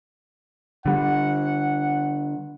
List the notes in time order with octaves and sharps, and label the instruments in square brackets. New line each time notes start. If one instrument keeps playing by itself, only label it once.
[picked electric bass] D3 G3 [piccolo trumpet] F#5